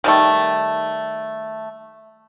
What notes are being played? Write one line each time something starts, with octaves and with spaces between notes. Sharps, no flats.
D#3 G3 A3